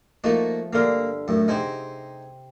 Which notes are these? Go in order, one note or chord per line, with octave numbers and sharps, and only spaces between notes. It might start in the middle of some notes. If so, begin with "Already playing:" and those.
F3 A3 A#3 D#4 F#4
G2 D3 A#3 A#4 F5
F#2 A2
C3 C4 D#4 G#4 C5 F#5